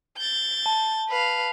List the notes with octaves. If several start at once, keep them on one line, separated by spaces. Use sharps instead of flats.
G6 A6
A5
B4 F5